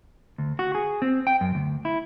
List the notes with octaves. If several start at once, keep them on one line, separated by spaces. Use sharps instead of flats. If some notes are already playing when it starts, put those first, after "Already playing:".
D2
F#4
G#4
C4
G5
F#2
D2
E4